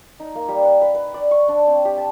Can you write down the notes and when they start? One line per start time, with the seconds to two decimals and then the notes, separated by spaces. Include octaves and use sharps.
0.20 D#4
0.35 A#3
0.48 G3
0.64 F#5
0.82 B4
0.94 B4
1.14 D5
1.31 C#6
1.48 D4
1.67 C4
1.85 G4
1.97 A5